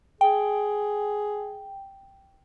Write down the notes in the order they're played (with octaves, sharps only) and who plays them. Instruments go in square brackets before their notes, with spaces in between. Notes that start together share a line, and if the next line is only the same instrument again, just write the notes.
[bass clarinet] G#4 [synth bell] G5